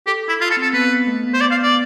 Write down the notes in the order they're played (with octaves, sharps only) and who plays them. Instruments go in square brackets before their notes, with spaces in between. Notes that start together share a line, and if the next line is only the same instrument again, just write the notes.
[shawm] G4 [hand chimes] A4
[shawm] E4
F4
A4
[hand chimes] C4
[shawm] A4
[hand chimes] B3 [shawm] B4
[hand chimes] A3
B3
[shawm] C5
D5
F5
[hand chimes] B3 [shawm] D5